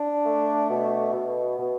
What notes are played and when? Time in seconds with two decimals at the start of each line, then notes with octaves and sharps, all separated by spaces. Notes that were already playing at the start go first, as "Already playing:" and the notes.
Already playing: D4
0.26 A3
0.70 B2
1.14 B2
1.59 B2